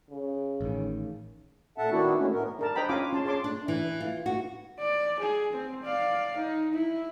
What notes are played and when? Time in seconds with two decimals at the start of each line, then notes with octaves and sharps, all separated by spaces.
0.10 C#3
0.61 A1 D#3
1.78 A#2 A4 E5 F#5 A5
1.91 D#3 B3 D4 E4 F#4
2.17 G#3 A3 C#4 F#4
2.32 A2 B3 A#4
2.59 D4 A#4 A5
2.75 B4 C5 D#5 G5 A#5 B5
2.89 C#4 F4 F5 G#5 D6
3.13 C#4 A5 C6
3.25 G#4 C#5 A5 C6 D6
3.44 D4
3.68 E3
4.00 F4
4.26 F#4
4.79 D5
5.19 G#4
5.52 C4
5.84 D5 F5
6.37 D#4
6.74 E4